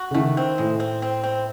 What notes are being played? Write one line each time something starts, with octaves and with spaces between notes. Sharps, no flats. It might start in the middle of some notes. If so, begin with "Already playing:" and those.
Already playing: F#4
C#3
D#3 A3
C4
A2 G#3
C4
C4
C4